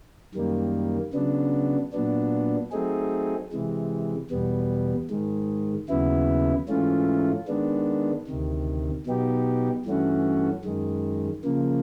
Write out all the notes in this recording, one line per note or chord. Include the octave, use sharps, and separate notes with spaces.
F#2 D#3 G3 A#3
C#3 F#3 B3 D4
A#2 F#3 B3 D4
F#3 A3 C4 D#4 G#4
C3 E3 G#3
E2 B2 G3 B3
G#2 D#3 G#3
D#2 C#3 F#3 B3 E4
G#2 E3 A3 C#4 F4
D#3 G#3 B3 D4
D2 C3 D#3
B2 F#3 B3 D#4 G4
G2 E3 A3 C#4 F#4
F#2 D#3 G#3
C#3 F3 A#3